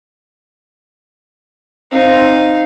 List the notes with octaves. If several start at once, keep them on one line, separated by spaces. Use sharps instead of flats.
C4 D#4 F5